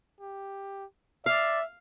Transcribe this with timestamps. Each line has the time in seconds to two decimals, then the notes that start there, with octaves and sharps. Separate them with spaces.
0.21 G4
1.26 D5 E5 F5